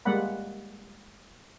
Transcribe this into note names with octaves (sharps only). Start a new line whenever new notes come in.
G3 G#3 A#3 D5 F#5 B5